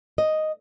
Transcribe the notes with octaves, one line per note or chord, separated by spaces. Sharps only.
D#5